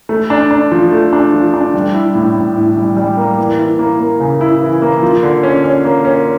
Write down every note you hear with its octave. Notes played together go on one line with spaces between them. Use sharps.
A3
D4
D4
F3
A3
D4
F3
D4
G3
E4
A2
A2
E4
G3
G3
A#3
E3
E4
A#3
A#3
C#3
E4
E3
A#3
F3
D3
C#4
C#4
A#3
C#4